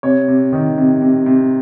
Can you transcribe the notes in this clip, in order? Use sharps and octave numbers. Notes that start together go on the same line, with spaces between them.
C3 C#5
C3
D#3
C3
C3
C3